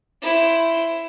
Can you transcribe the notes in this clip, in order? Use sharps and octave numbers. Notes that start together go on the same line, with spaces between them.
E4 C5